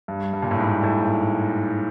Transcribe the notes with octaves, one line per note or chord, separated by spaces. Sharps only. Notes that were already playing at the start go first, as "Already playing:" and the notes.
G2
G2
A#2
A2
G#2
A2